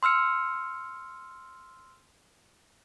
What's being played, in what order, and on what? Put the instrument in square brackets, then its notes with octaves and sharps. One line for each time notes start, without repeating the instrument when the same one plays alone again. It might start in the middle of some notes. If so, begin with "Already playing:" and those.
[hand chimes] C6 E6 F6 C#7